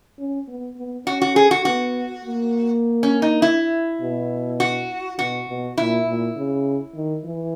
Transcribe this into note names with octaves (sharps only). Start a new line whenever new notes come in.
C#4
B3
B3
C#4 F#4
F#4
G#4
F#4
B3 F#4
A#3
C#4
D#4
E4
B2
F#4
B2 F#4
B2
A#2 E4
A#2
C#3
D#3
E3